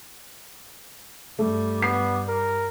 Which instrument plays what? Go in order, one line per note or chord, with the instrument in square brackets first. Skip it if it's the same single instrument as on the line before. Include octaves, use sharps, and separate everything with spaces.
[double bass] G2 G3 [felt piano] A3
[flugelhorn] B3 [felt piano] C7
[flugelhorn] A#4